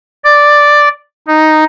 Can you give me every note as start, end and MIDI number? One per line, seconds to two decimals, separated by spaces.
0.24 0.89 74
1.28 1.64 63